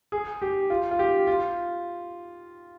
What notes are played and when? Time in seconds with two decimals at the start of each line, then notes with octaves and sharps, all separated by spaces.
0.12 G#4
0.42 G4
0.70 F4
0.91 F4
0.99 G4
1.27 F4